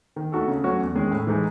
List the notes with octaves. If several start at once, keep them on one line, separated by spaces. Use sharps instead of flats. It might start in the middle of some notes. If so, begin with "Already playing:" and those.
D#3
A3 D#4 F#4 A4
C#3
F#3 A3 C#4 F#4
E2
D#3 G#3 C#4 G#4
A2
E3 G#3 D#4 G#4